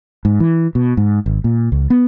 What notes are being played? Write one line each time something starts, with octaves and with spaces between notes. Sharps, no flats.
G#2
E3
B2
G#2
G#1
A#2
C#2
B3